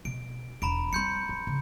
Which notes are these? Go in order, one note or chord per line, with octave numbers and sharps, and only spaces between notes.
B2 D7
E1 A#5 B5 D7
G3 C4 C6 G6 C#7
F#3
C#3